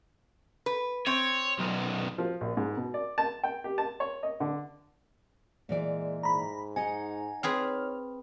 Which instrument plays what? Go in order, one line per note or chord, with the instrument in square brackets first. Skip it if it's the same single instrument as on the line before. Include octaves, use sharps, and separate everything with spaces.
[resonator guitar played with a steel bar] B4
[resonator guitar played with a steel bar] C4 [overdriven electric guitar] C#5
[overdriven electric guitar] B1 F#2
[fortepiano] F3
A#1
G#2
B2
D5
A5
G5
G4
A5
C#5
D#5
D3
[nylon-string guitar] A#2 E3 D5 [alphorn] G#3
[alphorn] G#2 [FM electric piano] A#5 B5
[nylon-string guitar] D#4 D#5 F#5 [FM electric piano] G#5
[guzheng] C4 G#4 B4 [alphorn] C#5 [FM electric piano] F6